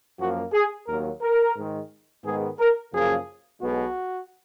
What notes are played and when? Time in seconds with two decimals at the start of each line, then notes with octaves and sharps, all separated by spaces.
0.19 F#2 F3 A#3 F#4
0.53 G#4
0.87 D#2 D#3 F#3 A#3 A#4
1.22 A#4
1.56 G#2 D#3 G#3
2.24 G#2 D#3 G#3 B3 G#4
2.59 A#4
2.93 F#2 C#3 F3 A#3 G#4
3.62 B1 B2 G#3 B3 F#4